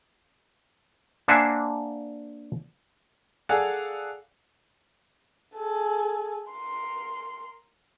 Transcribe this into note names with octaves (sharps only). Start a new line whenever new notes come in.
A#3 D4 C5 E5 F#5 G#5
G#4 A4 D5 F5 F#5 G#5
G#4 A4
A#4 C6